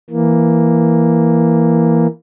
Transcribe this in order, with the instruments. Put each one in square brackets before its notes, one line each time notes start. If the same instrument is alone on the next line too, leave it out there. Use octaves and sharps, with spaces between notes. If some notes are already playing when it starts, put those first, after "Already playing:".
[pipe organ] E3 A#3